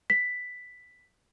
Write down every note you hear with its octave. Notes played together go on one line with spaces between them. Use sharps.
B6